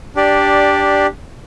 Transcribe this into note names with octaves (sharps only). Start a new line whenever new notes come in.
D4 G4 D5